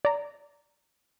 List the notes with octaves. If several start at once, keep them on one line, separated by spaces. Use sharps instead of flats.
D5 A#5